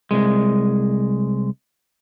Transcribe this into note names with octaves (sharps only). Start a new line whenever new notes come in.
C2 G#3